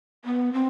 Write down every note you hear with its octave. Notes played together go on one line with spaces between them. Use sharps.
B3
C4